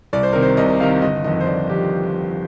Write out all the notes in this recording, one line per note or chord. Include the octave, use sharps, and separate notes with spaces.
C2 D5
C5
C3 D#3 A#4
C5
C2 D#5
C3 D#3 F5
G1 D#5
F2 D#3 D#5
C5
G1 D5
F2 D#3 G4